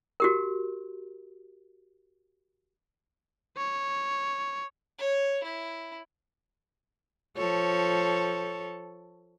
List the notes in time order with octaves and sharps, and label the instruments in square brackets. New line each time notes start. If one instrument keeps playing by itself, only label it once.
[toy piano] F#4 G4 A#4
[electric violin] C#5
[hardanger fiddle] C#5
E4
[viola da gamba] F3 A4 C#5